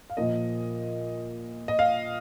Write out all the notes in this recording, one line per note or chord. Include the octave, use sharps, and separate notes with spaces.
F5
A#2 F3 A#3 D#5
D#5
F5